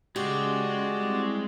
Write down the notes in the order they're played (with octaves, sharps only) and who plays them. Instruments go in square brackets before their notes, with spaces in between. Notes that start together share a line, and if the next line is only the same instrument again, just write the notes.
[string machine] C#3 [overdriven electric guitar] G#3 [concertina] F#4 D5 [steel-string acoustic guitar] G4
[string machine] G3 C4 E4